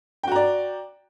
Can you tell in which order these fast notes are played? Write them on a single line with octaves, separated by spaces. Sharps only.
G5 F#4 A#5 D5